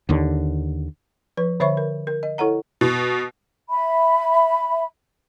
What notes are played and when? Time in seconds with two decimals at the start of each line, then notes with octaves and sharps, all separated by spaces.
0.09 D#2 D3
1.37 F3 B4
1.60 D3 C5 C#5 E5 B5 C#6
1.77 A#4
2.07 A#4
2.23 D#5
2.38 E4 A4 C#5 F#5 A#5
2.81 B2
3.70 E5 B5